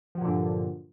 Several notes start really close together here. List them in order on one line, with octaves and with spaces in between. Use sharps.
F3 F#3 A#2 D3 G2